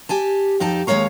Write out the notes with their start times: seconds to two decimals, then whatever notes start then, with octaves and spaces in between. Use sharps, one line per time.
0.09 G4 G#5 A5
0.60 F2 D#4 G4 A5
0.87 D#2 G#3 B3 C#5 F5 A#5